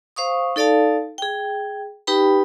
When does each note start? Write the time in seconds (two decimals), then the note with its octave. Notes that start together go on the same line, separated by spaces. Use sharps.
0.16 C5 F5 C#6 D#6
0.56 D#4 A4 D5 F5 A5
1.18 G#4 G5
2.07 D#4 G4 B4 G5 B5